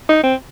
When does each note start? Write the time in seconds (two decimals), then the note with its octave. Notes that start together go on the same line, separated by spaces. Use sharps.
0.09 D#4
0.24 C4